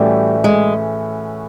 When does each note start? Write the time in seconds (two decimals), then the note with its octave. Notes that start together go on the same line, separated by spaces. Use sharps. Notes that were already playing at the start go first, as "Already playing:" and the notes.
Already playing: A2 E3 G3 A3 C#4 F#4
0.44 G#3